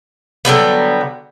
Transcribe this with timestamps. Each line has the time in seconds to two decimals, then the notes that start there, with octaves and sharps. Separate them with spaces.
0.45 D3 F#3 G3 B3